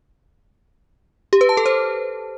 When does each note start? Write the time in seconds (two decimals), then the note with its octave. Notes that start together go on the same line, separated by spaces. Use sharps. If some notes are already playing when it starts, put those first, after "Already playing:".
1.33 G4
1.41 B4
1.49 A5
1.57 A4
1.66 C5